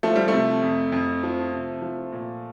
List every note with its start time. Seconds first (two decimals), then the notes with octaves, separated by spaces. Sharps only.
0.03 F3 A3
0.16 G3
0.28 A3
0.33 C3
0.62 F2
0.92 F2
1.23 F3
1.53 C3
1.82 F3
2.12 A#2